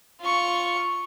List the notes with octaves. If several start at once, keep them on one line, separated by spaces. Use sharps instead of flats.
F4 C#6